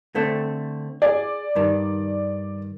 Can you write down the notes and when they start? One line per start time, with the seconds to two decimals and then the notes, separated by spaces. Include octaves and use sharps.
0.15 D3 A3 C4
1.02 G#4 D5
1.55 G2 D#3